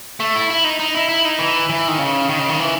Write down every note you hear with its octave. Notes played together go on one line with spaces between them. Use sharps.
A3
E4
E4
D#4
D#4
E4
E4
D#4
E3
E3
D#3
C#3
D#3
C#3
D#3
E3